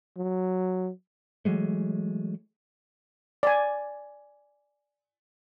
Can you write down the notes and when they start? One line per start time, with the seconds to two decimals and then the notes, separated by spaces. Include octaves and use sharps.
0.17 F#3
1.45 E3 F#3 G#3 A3
3.43 D5 G#5